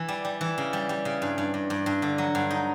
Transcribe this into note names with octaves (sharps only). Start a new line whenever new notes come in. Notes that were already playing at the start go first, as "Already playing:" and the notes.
Already playing: E3
G3
G3
E3
C#3
G3
G3
C#3
G2
G2
G2
G2
G2
D3
F#3
G2
D#4